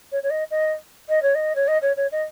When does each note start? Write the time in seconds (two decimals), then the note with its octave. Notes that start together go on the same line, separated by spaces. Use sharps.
0.12 C#5
0.23 C#5
0.30 D#5
0.51 D#5
1.09 D#5
1.22 C#5
1.35 D#5
1.55 C#5
1.68 D#5
1.82 C#5
1.97 C#5
2.12 D#5